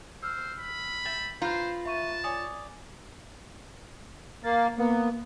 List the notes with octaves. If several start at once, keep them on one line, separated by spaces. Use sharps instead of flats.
C5 E6 F6
B5
E5 G5 A6
F4 B4 C5 A#5 G6
E5 A5 C#6 D#7
C#5 D5 G#5 D#6
A#3 A6
A#3 B3